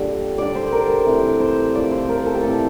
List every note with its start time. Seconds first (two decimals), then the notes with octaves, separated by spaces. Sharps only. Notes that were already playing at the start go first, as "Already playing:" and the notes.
Already playing: A#2 D3 G3 D5
0.38 D3 G3 D5
0.55 C5
0.72 A#4
1.06 C3 E3 A3
1.40 C5
1.75 A2 F3 A3 D5
1.91 C5
2.09 A#4
2.26 A4
2.34 G4
2.43 C3 E3 A3 A4